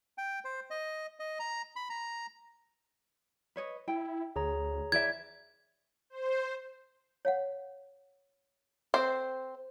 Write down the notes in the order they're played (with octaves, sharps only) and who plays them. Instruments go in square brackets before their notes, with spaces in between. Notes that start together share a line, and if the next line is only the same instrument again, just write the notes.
[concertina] G5
C5
D#5
D#5
A#5
B5
A#5
[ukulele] B4 C#5 D#5
[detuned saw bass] E4 [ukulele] G5
[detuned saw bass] D2 [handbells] G#4 C#5 A#5
[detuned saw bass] E3 [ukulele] E4 D5 E5 [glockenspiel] G#6
[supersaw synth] C5
[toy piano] C#5 F5 F#5
[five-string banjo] C4 C5 [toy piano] A4